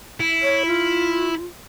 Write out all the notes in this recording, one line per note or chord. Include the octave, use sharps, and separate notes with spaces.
E4
C#5
F4